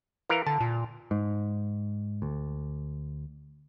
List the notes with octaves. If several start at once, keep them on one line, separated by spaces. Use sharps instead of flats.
E3 A#4 F5
D3 A5
A#2
G#2
D2